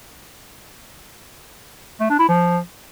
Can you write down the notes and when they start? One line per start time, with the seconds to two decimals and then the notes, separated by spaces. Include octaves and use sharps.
2.00 A3
2.10 D4
2.19 E4
2.29 F3